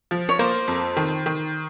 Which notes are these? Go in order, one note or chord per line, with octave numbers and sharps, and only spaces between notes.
F3
C#5
A#3 C5
F2
D#3
D#3